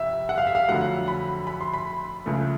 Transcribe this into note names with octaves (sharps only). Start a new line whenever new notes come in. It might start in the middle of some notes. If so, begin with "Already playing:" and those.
Already playing: G1 F2 C3 E5
F#5
F5
E5
F5
F2 D3 F#3 A3 F#5
B5
B5
C6
B5
C#2 C#3 F3 A3